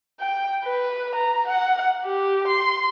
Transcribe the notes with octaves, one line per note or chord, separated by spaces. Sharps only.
G5
B4
A#5
F#5
G4
C6